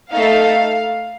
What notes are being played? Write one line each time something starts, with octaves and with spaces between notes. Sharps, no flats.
A3 D#4 A4 F5